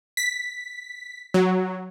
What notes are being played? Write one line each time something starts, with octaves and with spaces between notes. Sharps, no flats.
B6
F#3